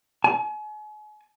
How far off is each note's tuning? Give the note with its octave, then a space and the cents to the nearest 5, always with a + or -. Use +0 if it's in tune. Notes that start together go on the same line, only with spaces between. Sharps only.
G#5 +40